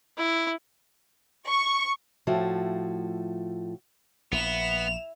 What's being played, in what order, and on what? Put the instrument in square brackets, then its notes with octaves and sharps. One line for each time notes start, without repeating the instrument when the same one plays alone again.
[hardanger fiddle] E4
[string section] C#6
[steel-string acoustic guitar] A2 F3 A3 F#4
[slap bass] A#1 [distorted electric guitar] B3 [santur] E4 [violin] E7 F7